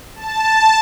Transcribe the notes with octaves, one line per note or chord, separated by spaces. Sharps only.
A5